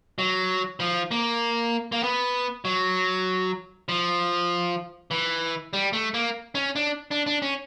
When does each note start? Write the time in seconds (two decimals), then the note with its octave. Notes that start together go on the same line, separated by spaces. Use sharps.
0.19 F#3
0.80 F3
1.11 A#3
1.92 A#3
2.03 B3
2.65 F#3
3.89 F3
5.11 E3
5.73 G3
5.93 A3
6.14 A#3
6.55 C#4
6.76 D4
7.11 D4
7.26 D4
7.42 C#4